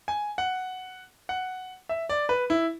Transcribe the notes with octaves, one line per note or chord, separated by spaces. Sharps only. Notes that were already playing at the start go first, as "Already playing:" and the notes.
G#5
F#5
F#5
E5
D5
B4
E4